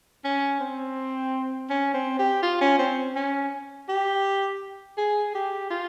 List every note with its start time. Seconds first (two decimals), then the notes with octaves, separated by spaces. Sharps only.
0.24 C#4
0.60 C4
1.70 C#4
1.94 C4
2.19 G4
2.43 F4
2.61 C#4
2.78 C4
3.16 C#4
3.89 G4
4.97 G#4
5.35 G4
5.70 F4